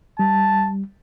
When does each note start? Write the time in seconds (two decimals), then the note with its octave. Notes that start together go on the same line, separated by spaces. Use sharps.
0.19 G3 A5